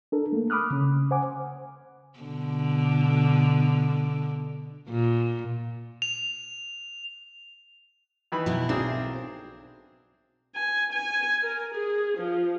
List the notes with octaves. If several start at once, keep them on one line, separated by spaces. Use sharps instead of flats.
D4 A4 A#4
A3 A#3
B5 D6 D#6 F6 F#6
C#3 C#4
C5 F#5 G#5 D6
B2 D3
A#2
F7
D#3 E3 B5
B2 F#3 E4
B1 C4 D4 G#4 A#4
G#5
G#5
A#4
G#4
F3